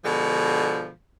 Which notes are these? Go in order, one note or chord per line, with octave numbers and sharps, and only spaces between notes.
B2 D3 F3 G#3